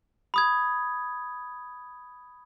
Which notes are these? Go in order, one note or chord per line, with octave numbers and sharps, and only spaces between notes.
B5 D#6 G#6